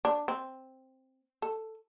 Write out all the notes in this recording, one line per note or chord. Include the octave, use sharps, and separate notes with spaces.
D4
C4
A4